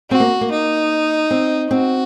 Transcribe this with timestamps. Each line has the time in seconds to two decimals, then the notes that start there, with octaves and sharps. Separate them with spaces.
0.10 C4 F#4
0.20 A#3
0.41 A#3
0.51 D#4
1.31 C4
1.71 C4 F#4